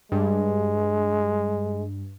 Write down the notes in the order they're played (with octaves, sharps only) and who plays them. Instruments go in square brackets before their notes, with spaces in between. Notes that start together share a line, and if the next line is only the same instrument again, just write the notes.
[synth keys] G2 [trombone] G#3